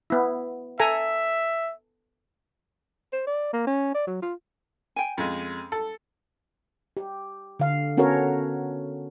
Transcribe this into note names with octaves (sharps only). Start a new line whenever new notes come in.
B3 E4
A4 E5 G#5 A#5
C5
D5
A#3
C#4
D5
F#3
F4
G5 G#5
F2 G#3 C#4
A4
G4
D3 F5
B3 C#4 F#4 A4 A#4 C#5